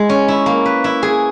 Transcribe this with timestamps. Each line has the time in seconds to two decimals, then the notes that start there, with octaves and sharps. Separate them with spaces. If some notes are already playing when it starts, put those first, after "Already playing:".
Already playing: G#3 E4
0.09 C#4
0.28 E4
0.46 A#3
0.66 B4
0.84 E4
1.03 G#4